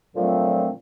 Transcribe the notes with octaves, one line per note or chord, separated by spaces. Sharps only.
A#2 D3 F3 F#3 A3 C4